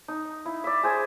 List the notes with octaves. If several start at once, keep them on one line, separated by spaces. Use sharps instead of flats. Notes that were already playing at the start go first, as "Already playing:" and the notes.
D#4
E4
D5 E5
G#4 C5 G#5